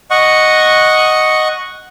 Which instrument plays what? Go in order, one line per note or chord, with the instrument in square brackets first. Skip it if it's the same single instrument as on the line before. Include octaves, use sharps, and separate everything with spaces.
[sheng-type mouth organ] D#5 F#5 C#6